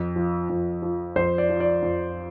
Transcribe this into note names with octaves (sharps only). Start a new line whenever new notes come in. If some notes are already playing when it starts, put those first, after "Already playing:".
Already playing: F2
F3
F2
F3
F2 C5
D5
F3
D5
F2